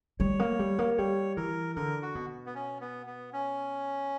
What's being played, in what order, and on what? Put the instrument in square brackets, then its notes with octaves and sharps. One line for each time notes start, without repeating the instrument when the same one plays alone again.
[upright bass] G3 [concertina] C#5
[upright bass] A#3
G3
A#3
[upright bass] G3 [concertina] C#5
[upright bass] E3 [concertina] A#4
[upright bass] D3 [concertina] A#4
[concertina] F#4
[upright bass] B2
[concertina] B3
C#4
B3
B3
C#4